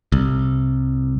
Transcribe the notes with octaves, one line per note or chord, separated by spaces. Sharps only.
C2